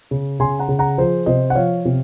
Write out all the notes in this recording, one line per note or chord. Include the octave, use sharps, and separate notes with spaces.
C#3
C#3 G#5 C6
F#5 A#5
C#3
F#5 A#5
F3 G#4 C5
C3 C5 D#5
F#5
F3 C#5 F5
C3